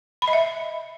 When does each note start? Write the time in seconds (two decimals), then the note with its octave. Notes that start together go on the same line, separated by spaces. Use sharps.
0.22 B5
0.28 D#5
0.33 E5